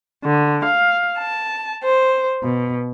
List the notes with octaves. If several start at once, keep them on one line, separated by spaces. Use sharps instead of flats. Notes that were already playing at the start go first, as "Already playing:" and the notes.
D3
F5
A5
C5
B2